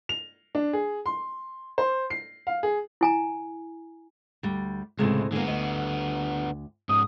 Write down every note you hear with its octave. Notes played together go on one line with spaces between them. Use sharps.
F7
D4
G#4
C6
C5
C7
F5
G#4
E4 G#5 A#5
D2 G3
C#2 A2 C3 G#3
D3 G#3 A#3 B3
D2 D#5
G#2 C#4 D#6